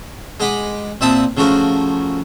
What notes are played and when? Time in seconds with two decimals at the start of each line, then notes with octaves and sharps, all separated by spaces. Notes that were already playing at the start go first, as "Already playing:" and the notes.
0.40 G#3 D#5 F#5 B5 D6
1.01 A#2 C4 E5 A5 B5 D#6
1.37 C#3 F3 A3 F#4 A#4